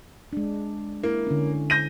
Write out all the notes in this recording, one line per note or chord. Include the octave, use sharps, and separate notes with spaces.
G#3 D4
A#3 E4
D3 C#4
G6 A#6 D#7